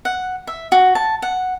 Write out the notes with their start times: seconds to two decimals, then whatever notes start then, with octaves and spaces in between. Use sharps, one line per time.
0.05 F#5
0.47 E5
0.72 F#4
0.95 A5
1.22 F#5